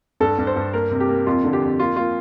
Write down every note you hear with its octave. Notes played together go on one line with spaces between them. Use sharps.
G2 A4
G2
C5
G2
A#3 A#4
C3
G4
A#3
F2 F4
D3
G4
F2
A#3 F4
A#3 F4